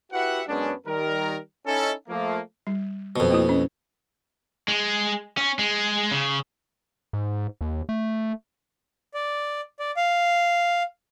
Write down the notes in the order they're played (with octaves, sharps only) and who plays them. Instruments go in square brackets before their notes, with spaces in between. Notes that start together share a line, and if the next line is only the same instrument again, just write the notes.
[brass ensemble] E4 F#4 G4 B4 E5 F#5
F#2 G#3 B3 C#4 D4
D#3 G3 A#4
C#4 D#4 E4 A4
F3 A3 A#3
[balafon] G3
[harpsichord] F2 B2 [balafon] B3
[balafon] A#3 E4 F#4
C#4
[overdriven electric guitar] G#3
C#4
G#3
C#3
[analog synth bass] G#2
D#2
A3
[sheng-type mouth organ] D5
D5
F5